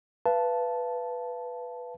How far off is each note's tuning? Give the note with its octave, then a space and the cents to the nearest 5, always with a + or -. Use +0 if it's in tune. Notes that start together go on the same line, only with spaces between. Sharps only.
B4 +0 F5 -35 A5 -5